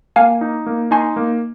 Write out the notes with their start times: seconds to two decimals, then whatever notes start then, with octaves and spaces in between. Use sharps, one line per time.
0.16 A#3 F5 G#5
0.41 D#4
0.66 A#3
0.91 D#4 G#5 C6
1.16 A#3